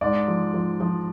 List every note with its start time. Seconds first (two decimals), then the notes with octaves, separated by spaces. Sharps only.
0.01 G#2 D5
0.27 F3
0.54 F3
0.80 F3